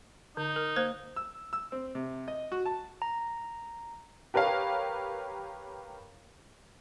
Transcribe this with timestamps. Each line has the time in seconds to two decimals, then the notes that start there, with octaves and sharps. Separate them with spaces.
0.37 D3 D#4
0.56 A#4
0.76 A#3 C5
1.16 E6
1.53 E6
1.72 C4
1.95 C3
2.28 D#5
2.52 F#4
2.66 A5
3.02 A#5
4.34 G4 A#4 B4 C#5 F5